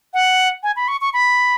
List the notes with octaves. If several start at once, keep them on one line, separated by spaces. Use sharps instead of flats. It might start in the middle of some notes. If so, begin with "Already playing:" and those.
F#5
G#5
B5
C#6
C#6
B5